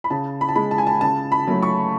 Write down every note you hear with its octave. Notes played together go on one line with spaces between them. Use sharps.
B5
C#3 A5
B5
A5
G#3 B5
A5
G#5
A5
C#3 A5
B5
F#3 A3
C#6